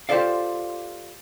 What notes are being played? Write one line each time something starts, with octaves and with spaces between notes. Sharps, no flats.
F4 G4 A4 C5 D5 F5